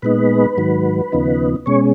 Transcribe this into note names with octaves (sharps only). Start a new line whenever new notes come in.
A#2 G#3 B3 D#4 B4
G#2 D#3 F#3
D#2 C#3 F3 B3 D#4
B2 G#3 C#4 C#5